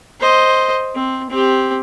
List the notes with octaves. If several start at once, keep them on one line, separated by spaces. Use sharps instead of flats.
C5 D#5
C4
C4 G4